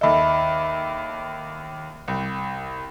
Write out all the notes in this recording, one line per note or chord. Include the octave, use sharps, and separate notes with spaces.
D#2 A4 D#5 E5 B5
C2